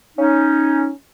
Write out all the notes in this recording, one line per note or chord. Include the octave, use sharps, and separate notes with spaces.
C#4 D#4